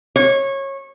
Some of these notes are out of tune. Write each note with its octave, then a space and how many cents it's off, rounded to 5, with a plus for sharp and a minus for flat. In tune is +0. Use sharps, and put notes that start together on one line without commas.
C#5 -20